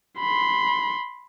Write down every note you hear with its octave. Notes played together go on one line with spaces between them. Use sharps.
B5 C6